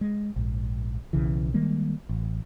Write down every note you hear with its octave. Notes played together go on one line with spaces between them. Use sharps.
G#3
A#1 G#2
B1 C#3 E3
D#3 G3 G#3 A#3
A1